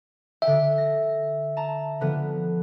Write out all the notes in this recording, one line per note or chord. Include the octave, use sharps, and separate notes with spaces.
D3 E5 G5
A#6
A5 A#5
D3 F3 B3